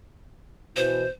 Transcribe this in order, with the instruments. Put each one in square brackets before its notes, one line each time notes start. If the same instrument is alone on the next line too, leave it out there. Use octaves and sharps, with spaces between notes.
[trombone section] B2 E3 [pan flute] C5